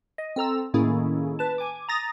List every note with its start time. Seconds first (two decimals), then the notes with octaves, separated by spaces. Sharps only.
0.18 D#5
0.36 C4 A4 A#5 E6
0.74 A2 D#3 A#3 C#4 E4 G#4
1.39 B4 A5
1.58 G#5 D6
1.89 A#5 D#6 A6 A#6